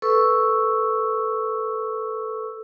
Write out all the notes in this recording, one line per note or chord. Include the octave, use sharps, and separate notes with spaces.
A4 B4 C#6 E6